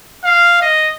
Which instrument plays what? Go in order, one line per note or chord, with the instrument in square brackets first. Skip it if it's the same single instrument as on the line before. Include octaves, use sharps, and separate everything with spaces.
[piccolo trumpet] F5
D#5